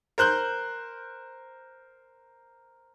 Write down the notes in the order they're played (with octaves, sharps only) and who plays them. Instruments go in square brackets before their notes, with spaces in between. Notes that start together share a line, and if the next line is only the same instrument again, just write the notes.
[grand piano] A#4 C5 F#6 G6